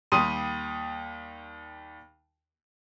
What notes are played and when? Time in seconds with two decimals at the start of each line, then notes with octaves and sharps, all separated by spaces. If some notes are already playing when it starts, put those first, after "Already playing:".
0.12 D#2 G3 C6 D#6 D#7